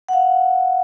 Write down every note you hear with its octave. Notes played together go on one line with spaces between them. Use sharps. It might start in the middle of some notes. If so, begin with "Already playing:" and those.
F#5
F5